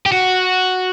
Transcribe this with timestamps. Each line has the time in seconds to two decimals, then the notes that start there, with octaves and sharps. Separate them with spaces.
0.06 G4
0.12 F#4